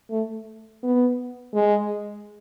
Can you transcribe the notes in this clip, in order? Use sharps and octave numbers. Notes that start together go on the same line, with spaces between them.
A3
B3
G#3